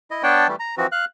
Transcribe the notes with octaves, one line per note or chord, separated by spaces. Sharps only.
E4 D#5
B3 D4 C#5 D5 G5 A5
E3 G3 A3
A#5
E3 F3 C4 F#4
F5 F#6